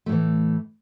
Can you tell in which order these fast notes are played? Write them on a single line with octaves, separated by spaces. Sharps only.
A3 A2 E3